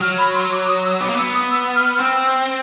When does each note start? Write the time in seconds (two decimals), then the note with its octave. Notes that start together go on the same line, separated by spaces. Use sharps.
0.01 F#3 F6
0.18 B5
0.35 C6
0.52 D6
0.68 D#6
0.85 E6
1.01 B3 D6
1.09 A#3
1.16 B3 E6
1.34 D#6
1.51 E6
1.75 F6
2.00 C4 E6